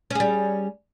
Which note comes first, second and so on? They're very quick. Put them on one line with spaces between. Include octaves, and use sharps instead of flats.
C#4 G#4 G3